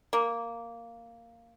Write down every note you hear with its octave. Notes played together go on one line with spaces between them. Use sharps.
A#3